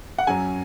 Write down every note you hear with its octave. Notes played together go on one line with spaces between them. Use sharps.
F#5
F#2 F#3 C#4 G#5